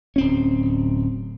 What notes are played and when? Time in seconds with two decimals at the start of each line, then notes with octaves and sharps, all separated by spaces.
0.16 D1 C4 C#4